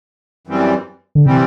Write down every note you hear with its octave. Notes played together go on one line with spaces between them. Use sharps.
F#2 E3 G3 C4
D3
C3 E3 G3 C4